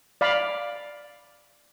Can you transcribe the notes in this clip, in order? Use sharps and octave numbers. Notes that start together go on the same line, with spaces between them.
D5 F5 B5